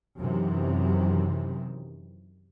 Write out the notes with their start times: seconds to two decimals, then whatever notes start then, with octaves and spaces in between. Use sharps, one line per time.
0.18 F#2 C3 D#3 E3